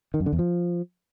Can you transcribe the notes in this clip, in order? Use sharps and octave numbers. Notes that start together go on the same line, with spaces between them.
D#3
F#2
D3
E2
F3